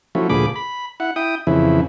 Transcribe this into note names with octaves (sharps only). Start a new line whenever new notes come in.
F3 F#3 A3 C#4 E4
D2 A#2 F3 G#4 B5 D6
B5
E4 F#5
E4 G5 D#6
F2 C#3 E3 E4